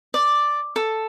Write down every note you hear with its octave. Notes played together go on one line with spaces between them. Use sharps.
D5
A4